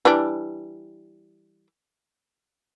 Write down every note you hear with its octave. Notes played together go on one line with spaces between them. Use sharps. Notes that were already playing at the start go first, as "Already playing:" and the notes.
E3 G3 D4